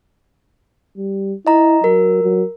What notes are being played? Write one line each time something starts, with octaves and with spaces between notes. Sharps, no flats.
G3
E4 D#5 A#5
F#3 A#4
F#3